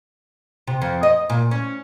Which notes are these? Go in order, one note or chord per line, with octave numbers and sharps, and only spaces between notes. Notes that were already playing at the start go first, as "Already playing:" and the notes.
C3
F2
D#5
A#2
C#4